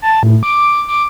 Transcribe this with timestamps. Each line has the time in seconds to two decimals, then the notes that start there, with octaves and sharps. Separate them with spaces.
0.02 A5
0.23 A2
0.43 D6
0.88 D6